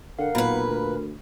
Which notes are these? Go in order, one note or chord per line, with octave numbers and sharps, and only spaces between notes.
D3 A#4 F5 F#5
B1 A#2 B4 B5
D2